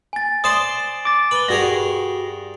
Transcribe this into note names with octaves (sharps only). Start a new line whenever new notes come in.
G#5 A6
C5 D5 C6 D#6 E7
D6 A6
B4 F#7 G7
G2 F#4 G#4 A#4 A#6